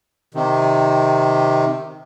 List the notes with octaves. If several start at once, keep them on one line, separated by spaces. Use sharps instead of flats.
C3 D#3